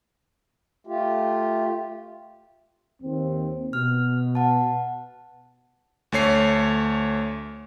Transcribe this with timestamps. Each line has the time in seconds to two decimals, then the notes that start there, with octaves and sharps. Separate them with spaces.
0.87 A3 F4 G4
3.02 D#2 C4
3.73 B2 F6
4.35 F#5 A5
6.12 D2 A3 C#5 C7